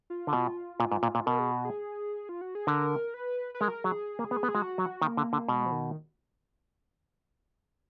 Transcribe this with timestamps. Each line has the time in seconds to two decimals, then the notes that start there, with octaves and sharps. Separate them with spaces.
0.10 F4
0.27 D3
0.33 B2
0.80 A#2
0.92 G#2
1.03 A#2
1.15 A#2
1.26 B2 A#4
1.39 G#4
1.52 F#4
1.65 G#4
2.29 F4
2.41 F#4
2.55 G#4
2.67 D3 A#4
3.14 B4
3.55 B4
3.61 G#3 A#4
3.84 F#3 G#4
4.19 A#3
4.31 B3
4.43 B3
4.48 G#4
4.54 G#3 F#4
4.78 F#3
5.02 D#3 A#3
5.17 D3
5.33 D3
5.48 B2 G#3
5.66 F3
5.72 D#3